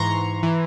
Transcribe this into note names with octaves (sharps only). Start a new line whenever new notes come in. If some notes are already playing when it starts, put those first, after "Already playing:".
Already playing: G#2 E3 A#5 C6 C#6
E3